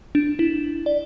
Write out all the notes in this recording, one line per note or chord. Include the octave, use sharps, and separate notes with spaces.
D4
E4
D5